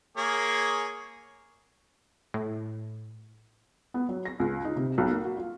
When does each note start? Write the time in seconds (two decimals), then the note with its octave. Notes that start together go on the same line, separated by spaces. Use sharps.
0.17 A#3 G#4 C#5
2.34 A2
3.94 B3
4.09 F#3
4.25 A#6
4.40 C#2
4.65 D#4
4.76 C3
4.98 B1
5.11 A#3
5.24 F#4
5.37 F4